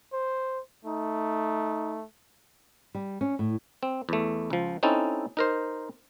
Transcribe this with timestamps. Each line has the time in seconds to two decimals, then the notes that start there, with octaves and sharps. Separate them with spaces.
0.13 C5
0.85 A3 D#4
2.95 G3
3.21 C#4
3.39 A2
3.83 C4
4.09 E2 A3
4.50 C#2 F3
4.83 C4 C#4 D#4 E4 A4
5.37 D#4 A#4 C5